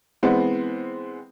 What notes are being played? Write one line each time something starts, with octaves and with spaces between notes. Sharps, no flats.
E3 G#3 B3 C4